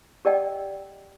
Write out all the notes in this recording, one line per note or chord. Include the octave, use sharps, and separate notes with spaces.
G4 A#4 D5 D#5 F#5 G5